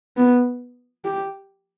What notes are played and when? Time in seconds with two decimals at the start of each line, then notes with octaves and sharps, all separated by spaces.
0.17 B3
1.04 G4